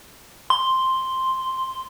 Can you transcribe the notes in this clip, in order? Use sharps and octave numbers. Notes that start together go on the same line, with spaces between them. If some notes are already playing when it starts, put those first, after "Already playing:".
C6